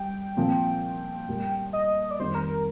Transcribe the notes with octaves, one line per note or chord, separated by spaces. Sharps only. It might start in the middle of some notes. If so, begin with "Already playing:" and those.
Already playing: G3 G5
A#2 F3 C4
A#2 G3 A#3
D#5
D5
F2 D#3 G3 C4 C5
A#4
A#4